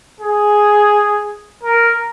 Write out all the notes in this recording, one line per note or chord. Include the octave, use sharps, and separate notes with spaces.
G#4
A#4